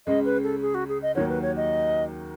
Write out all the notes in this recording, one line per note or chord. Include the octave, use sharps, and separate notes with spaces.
C#2 C#3 G#3 D#5
B4
A4
G#4
F#4
G#4
D#5
D#2 D#3 F#3 C#5
B4
C#5
D#5